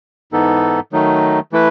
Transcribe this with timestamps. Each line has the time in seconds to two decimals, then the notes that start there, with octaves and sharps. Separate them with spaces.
0.32 G#2 E3 B3 D#4 A4
0.92 D#3 F#3 A3 D#4
1.52 E3 A3 E4 B4